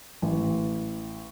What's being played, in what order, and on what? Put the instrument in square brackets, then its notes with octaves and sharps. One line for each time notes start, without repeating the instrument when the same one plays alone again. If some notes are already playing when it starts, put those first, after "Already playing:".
[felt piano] A1